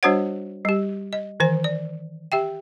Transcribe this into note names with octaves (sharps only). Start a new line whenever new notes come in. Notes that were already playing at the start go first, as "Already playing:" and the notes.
G3 D4 F#4 C5 C#5 F#5
G3 G4
D#5
D#3 E3 C5 G#5
D5
G4 E5 G5